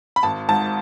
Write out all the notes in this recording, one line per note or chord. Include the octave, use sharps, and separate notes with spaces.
B5
G#1 A5
G#2 A5